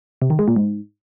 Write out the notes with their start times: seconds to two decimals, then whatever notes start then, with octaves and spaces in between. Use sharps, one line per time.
0.22 C3
0.30 D#3
0.39 G#3
0.48 A#2
0.56 G#2